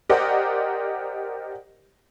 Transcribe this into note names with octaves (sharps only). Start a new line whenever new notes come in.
G4 A#4 C5 D5 D#5 F#5